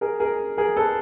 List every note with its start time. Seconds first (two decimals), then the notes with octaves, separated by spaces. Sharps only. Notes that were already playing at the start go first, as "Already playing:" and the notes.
0.01 G#4 A#4
0.20 G#4 A#4
0.57 G#4 A#4
0.76 A4 B4